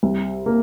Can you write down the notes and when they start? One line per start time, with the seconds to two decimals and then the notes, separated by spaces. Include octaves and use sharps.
0.03 C2
0.46 A#3